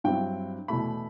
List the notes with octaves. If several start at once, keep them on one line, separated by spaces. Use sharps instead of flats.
G2 F#3 C4 E4 G5
E2 B2 A3 E4 B5